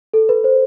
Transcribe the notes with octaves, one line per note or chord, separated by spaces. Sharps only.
A4
B4
C5